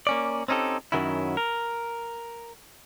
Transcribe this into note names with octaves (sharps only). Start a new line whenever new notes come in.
A#3 C#4 D5
C4 C#4 D#4 G4 A4
F#2 C3 D#3 F#3 C#4 E4
A#4